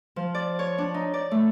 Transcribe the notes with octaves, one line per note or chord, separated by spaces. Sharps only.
F3
D5
C#5
D4
D#4
D5
A3